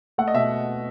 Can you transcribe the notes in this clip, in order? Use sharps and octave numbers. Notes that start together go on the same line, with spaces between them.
A3 F#5
D#5
B2 E5